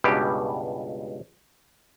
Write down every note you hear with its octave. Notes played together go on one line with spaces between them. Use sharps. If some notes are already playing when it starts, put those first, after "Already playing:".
C#2 G2 B2 G4